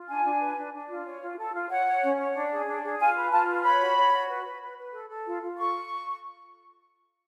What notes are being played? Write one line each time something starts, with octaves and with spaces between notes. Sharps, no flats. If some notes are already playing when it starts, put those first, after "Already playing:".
Already playing: F4
D4 G#5
D4
B4
D4
D4
F4
C#5
F4
A4
F4
C#5 F#5
C#5
C#4
C#5
D4
G#4
D4
G#4
F4 G#5
B4
F4 A5
B4
C#5 B5
F#4
C#5
F#4
B4
B4
B4
B4
A4
A4
F4
F4
A4 C#6